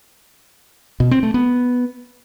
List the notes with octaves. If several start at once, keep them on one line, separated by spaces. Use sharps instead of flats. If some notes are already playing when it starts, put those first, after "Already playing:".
B2
C4
A3
B3